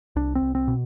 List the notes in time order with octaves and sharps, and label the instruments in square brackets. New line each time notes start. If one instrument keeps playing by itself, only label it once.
[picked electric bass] C2 D4
C4
C2
C4
B2